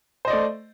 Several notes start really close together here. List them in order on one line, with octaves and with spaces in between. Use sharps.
C5 D#5 D5 A3